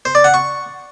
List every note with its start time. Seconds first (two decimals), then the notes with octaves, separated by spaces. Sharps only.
0.05 C5
0.15 D5
0.24 F#5
0.34 C#6